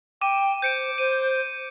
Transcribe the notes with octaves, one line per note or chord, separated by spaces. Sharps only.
G5 D6 D#7
C5 G6 C#7 D7
C5 D#7